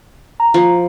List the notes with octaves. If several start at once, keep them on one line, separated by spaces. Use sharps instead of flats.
A#5
F3